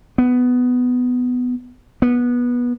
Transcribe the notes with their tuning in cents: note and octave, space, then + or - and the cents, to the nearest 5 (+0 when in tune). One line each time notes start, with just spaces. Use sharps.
B3 +10
B3 -20